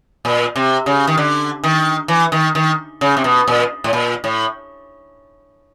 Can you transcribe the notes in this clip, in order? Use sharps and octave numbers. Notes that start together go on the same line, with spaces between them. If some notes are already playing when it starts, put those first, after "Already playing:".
A#2
C3
C#3
D#3
D3
D#3
E3
D#3
D#3
C#3
C3
B2
A#2
A2
A#2
A2